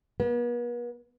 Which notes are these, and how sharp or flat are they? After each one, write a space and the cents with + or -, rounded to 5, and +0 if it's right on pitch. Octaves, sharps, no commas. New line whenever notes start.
B3 -45